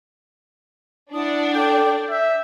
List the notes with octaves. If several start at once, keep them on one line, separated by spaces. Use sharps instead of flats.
D4 E4 D5 F#5 D#6
A4 G5 D6 G6
E5 G6